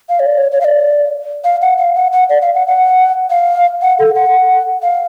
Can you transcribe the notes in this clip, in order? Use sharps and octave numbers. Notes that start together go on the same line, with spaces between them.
F5
C#5
D5
C#5
C#5
F5
D5
F5
F#5
F5
F#5
F#5
D5
F5
F#5
F#5
F5
F#5
A4
F#5
F5